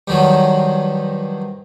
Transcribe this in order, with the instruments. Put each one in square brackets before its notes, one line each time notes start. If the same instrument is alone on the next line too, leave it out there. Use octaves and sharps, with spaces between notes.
[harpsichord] G2 D#3 F3 F#3